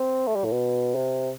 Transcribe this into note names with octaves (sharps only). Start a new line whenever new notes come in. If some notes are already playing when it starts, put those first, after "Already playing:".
Already playing: C4
A3
G3
A2
B2
C3